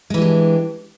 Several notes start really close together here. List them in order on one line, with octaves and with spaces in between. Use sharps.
G#3 E3 G4 D4